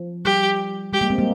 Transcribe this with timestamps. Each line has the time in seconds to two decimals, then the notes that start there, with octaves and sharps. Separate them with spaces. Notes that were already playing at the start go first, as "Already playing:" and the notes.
Already playing: F3
0.25 G3 G4
0.93 G#3 G4
1.01 G3 A#3
1.10 G#3 C4
1.18 G3 A#3